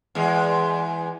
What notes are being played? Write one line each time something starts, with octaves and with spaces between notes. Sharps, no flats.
E2 G#3